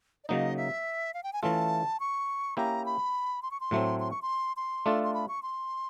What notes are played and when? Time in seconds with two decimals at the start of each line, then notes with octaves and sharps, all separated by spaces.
0.24 D5
0.28 C#3 F#3 A#3 D#4 D#5
0.57 E5
1.14 F5
1.23 G5
1.33 G#5
1.43 E3 A3 C#4 F4 A4 A5
2.00 C#6
2.57 A#3 C#4 E4 G4 A#5
2.85 B5
3.42 C6
3.51 C#6
3.60 C6
3.71 A2 F#3 A3 C4
4.00 C6
4.11 C#6
4.22 C6
4.57 C6
4.86 A3 D4 F4 A4
5.04 C6
5.14 B5
5.28 C#6
5.43 C6